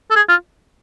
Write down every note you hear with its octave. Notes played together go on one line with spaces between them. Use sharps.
A4
G#4
F4